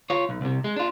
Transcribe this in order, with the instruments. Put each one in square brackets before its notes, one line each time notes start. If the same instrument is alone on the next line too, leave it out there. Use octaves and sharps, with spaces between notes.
[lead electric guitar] F4 C#5
B1
C2 C3
G#3
D4 F4